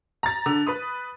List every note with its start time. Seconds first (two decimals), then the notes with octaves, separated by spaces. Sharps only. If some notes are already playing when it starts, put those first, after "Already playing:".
0.23 A#5 A6
0.46 D3
0.67 B4 B5 D#6